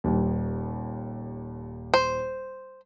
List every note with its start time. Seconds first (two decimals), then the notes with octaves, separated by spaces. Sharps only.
0.04 D#1 D#2
1.94 C5